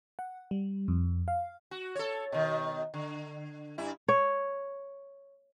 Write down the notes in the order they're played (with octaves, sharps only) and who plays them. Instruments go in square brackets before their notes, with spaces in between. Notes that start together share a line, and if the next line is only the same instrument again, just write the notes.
[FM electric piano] F#5
G3
F2
F5
[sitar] F#4
A4 C#5
B2 D#3
D3
G2 E4
[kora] C#5